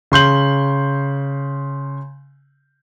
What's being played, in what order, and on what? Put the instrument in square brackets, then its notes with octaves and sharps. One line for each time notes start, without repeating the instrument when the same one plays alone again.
[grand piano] C#3 C6 G6 F#7